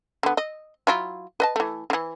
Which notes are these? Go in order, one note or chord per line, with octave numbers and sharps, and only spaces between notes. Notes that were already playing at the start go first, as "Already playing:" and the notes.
D3 B3
D#5
F#3 E4 F4
B4 D#5 A5
E3 A3
D3 E3